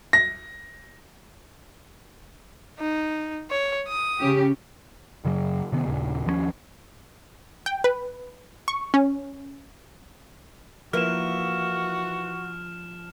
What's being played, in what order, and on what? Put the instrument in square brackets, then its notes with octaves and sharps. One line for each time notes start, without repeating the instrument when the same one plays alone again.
[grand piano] A#6
[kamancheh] D#4
C#5
D#6
[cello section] C#3 C#4 G4
[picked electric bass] F#2 C#3 F#3
C3 D#3 B3
D#2 A#2 C#3
D#2 F3 G#3 C#4
[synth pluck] G5
B4
C#6
C#4
[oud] E3 A#3 [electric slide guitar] F3 [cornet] F#4 [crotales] F6 E7